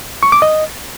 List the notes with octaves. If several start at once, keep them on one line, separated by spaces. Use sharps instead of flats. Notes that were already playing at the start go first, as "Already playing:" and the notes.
C#6
D6
D#5